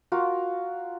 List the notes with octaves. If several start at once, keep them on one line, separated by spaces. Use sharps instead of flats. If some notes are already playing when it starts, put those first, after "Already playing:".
F4 F#4 A#4